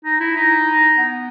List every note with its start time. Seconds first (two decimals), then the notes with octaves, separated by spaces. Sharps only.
0.05 D#4
0.20 E4
0.37 D#4
0.98 B3